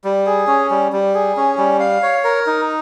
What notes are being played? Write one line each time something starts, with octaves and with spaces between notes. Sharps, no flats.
G3
G#4
C#4
G3
G3
G#4
C#4
G3
F5
C#5
A#4
D#4